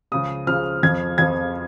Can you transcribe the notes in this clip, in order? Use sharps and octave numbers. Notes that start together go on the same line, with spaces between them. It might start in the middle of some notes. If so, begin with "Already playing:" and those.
C#2 C#3 F3 D#6
C#2 C#3 F3 F6
F2 F3 G#6
F2 F3 G#6